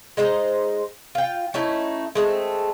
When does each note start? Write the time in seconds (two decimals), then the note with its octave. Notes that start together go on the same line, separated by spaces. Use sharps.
0.17 G#3 D#4 C5 D#5
1.15 F4 G5
1.54 A3 C#4 D#4 E4
2.15 G#3 A3 C4